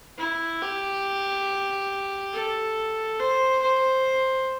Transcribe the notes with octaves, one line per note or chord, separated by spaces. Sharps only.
E4
G4
A4
C5
C5